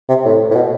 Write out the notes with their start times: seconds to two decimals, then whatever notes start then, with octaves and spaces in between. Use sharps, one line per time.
0.09 C3
0.25 A2
0.51 A2
0.55 B2